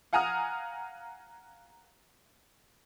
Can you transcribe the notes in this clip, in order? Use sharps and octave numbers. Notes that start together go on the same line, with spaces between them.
F5 F#5 G#5 A#5 D#6 F6